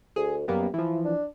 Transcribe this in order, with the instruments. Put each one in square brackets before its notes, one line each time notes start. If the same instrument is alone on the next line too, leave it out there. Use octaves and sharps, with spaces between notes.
[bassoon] D2 [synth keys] G#4
[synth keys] F#2 A#3 B3 [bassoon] G3
[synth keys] E3 F3 [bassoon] E4
[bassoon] D4